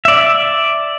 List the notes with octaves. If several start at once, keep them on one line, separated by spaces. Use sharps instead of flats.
D5 E5